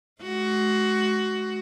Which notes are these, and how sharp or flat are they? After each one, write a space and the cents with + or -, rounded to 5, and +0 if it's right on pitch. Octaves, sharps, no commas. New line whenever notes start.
G#3 +45 F#4 +15